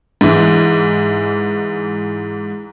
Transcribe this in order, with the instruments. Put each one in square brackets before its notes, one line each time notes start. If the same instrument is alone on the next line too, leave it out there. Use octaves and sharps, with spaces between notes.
[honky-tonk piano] G#2 E3